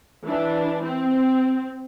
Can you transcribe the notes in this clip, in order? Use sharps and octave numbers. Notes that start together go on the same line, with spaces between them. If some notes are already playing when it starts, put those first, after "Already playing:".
E3 D4
C4